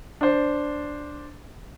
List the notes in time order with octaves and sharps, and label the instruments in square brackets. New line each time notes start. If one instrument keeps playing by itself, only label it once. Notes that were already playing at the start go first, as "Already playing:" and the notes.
[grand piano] D4 C5